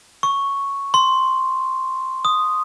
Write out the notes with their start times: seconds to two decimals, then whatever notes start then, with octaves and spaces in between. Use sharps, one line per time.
0.23 C#6
0.94 C6
2.25 D#6